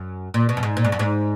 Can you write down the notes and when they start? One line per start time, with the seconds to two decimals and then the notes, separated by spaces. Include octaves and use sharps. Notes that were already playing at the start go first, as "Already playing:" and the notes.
Already playing: F#2
0.34 A#2
0.49 B2
0.57 F#2
0.63 G#2
0.77 A#2
0.85 G#2
0.92 F#2
0.99 G#2